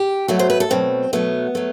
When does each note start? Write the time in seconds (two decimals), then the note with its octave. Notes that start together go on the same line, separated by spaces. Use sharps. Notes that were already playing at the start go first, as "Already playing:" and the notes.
Already playing: G4
0.28 B2 F#3 A3 F#4
0.39 C5
0.50 B4
0.60 A4
0.70 B2 F#3 A3 C4
1.13 B2 F#3 A3 B3
1.55 F#3 A3